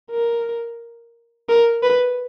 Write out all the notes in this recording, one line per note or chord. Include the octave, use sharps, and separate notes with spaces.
A#4
A#4
B4